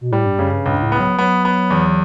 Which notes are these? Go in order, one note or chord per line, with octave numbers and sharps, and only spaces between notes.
B2
A2 G3
G2
F#2 C#3
G2
C#2 G2
A2
B3
F#3
F#3 B3
B3
E2